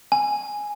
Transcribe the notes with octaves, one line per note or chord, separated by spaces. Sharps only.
G#5